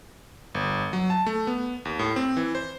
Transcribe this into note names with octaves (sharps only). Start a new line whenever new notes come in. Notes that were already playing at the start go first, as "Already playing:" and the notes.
G1
F#3
A5
A3
B3
D#2
A2
C4
E3
C5